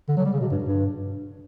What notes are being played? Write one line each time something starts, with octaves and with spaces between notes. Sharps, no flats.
D3
F#3
G3
C#3
B2
G2
G2